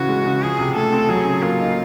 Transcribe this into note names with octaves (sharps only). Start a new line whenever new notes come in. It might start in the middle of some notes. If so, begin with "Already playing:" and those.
Already playing: C#3 E3 F#4
G#3
C#3
F3 G#4
C3
A3 A4
C4
F#3 G#4
C#3
A#3 F4
D#4